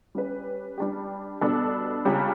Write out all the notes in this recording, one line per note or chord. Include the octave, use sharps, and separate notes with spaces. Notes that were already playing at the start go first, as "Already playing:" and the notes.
G3 C#4 G4 B4
G3 D4 G4
B2 G3 B3 D4 A4
C#2 C#3 G3 C#4 G4